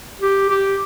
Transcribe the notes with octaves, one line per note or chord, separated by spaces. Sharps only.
G4
G4